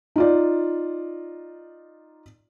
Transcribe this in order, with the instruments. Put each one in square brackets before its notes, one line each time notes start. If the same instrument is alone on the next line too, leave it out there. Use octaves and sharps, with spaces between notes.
[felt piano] D#4 F4 D5